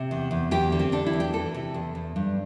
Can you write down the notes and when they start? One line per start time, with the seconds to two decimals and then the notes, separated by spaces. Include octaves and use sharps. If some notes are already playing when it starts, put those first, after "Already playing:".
Already playing: C3
0.11 E2
0.31 E2
0.51 E2 G4
0.72 D3
0.79 C4
0.92 D3 D4
1.06 E4
1.13 E2
1.20 G4
1.33 E3 A4
1.54 C3
1.74 E2
1.95 E2
2.16 G2